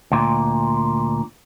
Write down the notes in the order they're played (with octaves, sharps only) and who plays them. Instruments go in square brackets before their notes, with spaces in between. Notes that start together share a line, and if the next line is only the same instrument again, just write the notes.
[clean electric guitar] D2 A#2